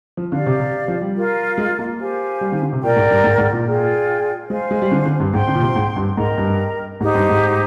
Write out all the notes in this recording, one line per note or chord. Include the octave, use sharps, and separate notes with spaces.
F3
D3 G4 D5 F5
C3
C3
F3
G3
F4 A#4 F5
G#3
A#3
G4 C5 F5 G#5
G3
D#3
D3
C3
A#2 A#4 D5 G5
G#2
G2
G#2
G#2
A#2
F4 G#4 D5 G5
G#3 C5 F5 G#5
G#3
G3
D3
D3
G2
G#2 C5 G5 C6
D3
A#2
C3
G#2
G2
G#2 A#4 D#5 G5 A#5
G2
G#2 D#4 G4 C5
G2
G#2